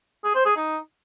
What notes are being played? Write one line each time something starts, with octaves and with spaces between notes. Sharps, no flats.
G#4
C5
G#4
D#4